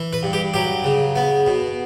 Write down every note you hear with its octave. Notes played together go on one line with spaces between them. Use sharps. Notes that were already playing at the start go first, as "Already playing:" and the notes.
Already playing: E3
B4
G2
G4
F#3 G4
C#3
B3
B2